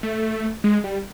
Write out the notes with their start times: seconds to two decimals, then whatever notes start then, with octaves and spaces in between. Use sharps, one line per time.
0.03 A3
0.64 G#3
0.84 G3